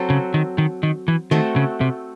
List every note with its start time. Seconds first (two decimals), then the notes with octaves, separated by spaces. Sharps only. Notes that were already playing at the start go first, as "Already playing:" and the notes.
Already playing: F#3 C4 F#4 A4
0.10 C#3
0.34 D#3
0.58 D#3
0.83 D#3
1.08 E3
1.31 D#3 A3 C4 F#4 A4
1.56 C#3
1.81 C3